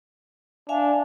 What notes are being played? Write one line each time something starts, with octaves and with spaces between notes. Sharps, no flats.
D4 E5 F5 G#5